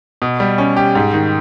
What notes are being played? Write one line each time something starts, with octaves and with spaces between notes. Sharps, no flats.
B2
G3
C#4
G4
G#2
D#3